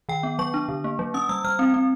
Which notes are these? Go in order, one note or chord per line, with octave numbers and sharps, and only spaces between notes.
D#3 G5
B3
F#3 C#6
D4
D3
A#3
F#3
C#4 D#6
G3 E6
G3 F6
C4
C4